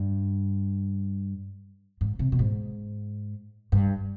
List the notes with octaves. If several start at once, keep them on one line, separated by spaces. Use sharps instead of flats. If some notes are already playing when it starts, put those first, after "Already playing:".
Already playing: G2
G#2
C3
B2
G#2
G2